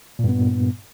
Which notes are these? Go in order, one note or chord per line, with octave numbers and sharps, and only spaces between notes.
G2 A#2 B3